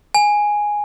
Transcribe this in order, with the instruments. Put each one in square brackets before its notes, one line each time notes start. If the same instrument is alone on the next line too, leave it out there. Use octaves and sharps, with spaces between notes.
[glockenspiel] G#5